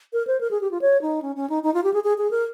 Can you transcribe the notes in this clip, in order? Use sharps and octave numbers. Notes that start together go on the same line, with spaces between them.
A#4
C5
A#4
G#4
G4
F4
C#5
D#4
C#4
C#4
D#4
D#4
F4
G4
G#4
G#4
G#4
A#4